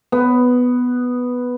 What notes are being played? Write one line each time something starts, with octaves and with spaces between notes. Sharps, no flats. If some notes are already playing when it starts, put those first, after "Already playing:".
B3